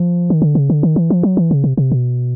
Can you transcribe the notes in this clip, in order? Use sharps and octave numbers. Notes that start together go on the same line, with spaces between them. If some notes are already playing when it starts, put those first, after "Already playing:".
Already playing: F3
D#3
D3
C#3
D3
D#3
E3
F3
F#3
E3
C#3
C3
C3
B2